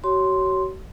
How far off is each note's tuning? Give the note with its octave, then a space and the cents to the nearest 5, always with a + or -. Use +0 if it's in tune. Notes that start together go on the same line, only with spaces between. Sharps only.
F#4 +40 C#5 +0 C6 +0